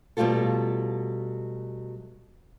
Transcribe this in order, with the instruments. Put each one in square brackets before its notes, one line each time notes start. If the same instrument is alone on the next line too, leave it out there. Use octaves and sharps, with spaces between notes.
[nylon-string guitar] B2 F#3 G3 A3 F4 A4